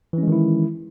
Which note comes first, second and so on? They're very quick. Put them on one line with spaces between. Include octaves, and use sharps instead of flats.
E3 C#4 G#3 D#3 E4